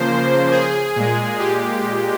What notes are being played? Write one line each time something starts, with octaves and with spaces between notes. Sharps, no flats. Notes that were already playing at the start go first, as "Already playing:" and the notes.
Already playing: C#3 F3 A#3 C5
G#4
A#2 G#3
G4